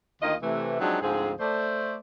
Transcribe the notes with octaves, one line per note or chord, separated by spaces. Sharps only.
D2 D#3 A#3 F4 D#5
C3 E3 A3
F3 F#3 G#3 C4 D4 D#4
D2 G#2 F3 C4 G#4
A3 C5 D5